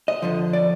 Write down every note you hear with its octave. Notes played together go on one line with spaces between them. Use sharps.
D#5
F2 D3 F3
D5